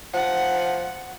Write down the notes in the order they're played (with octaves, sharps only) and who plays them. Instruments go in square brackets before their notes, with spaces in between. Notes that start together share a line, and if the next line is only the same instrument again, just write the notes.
[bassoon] F3 [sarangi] F#5